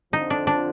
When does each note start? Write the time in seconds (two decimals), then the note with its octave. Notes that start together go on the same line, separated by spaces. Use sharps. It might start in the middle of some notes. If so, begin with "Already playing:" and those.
0.13 F2 D3 F3 D#4
0.30 D4
0.47 D4